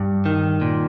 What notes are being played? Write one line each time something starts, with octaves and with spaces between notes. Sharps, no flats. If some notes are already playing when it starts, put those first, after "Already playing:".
Already playing: G2
D#3
A#2